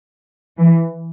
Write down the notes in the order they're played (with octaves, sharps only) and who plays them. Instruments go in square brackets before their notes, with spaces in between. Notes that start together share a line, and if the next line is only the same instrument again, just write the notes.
[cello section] E3